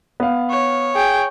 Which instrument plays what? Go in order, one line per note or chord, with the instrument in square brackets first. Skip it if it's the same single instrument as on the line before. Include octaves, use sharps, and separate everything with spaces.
[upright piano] B3 F5
[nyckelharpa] C#5
[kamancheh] G#4 G5